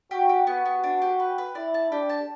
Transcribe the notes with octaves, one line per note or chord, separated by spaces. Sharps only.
F#4 G4
G4
B3 F#4
B3
D4
G4
B4
B4
E4 D5
A5
D4 G4
A5